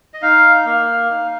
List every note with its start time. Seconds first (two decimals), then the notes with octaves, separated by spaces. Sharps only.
0.14 D#5
0.22 D#4 F5
0.66 A#3 F5
1.10 D#4